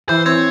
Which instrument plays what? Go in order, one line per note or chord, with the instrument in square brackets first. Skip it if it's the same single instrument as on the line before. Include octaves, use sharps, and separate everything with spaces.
[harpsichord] E3 [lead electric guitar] C5
[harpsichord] C4 [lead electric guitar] C#5